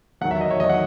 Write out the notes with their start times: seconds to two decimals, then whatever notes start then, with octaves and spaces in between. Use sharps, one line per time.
0.21 E2 D#3 F#3 F#5
0.31 E5
0.41 D#5
0.50 C#5
0.60 E2 D#3 F#3 D#5
0.69 F#5